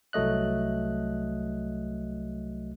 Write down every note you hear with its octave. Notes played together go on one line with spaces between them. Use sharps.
C2 F#3 A3 D#5 F#6